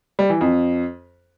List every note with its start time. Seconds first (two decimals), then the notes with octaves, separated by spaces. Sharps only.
0.19 G3
0.30 E3
0.41 F2